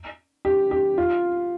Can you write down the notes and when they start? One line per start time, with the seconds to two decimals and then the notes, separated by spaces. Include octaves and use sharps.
0.45 G4
0.71 G4
0.98 F4